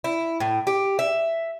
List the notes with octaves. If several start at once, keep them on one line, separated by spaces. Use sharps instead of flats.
E4
A2
G4
E5